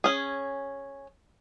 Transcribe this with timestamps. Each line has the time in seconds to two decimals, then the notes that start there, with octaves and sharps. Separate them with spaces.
0.04 C#4 G#4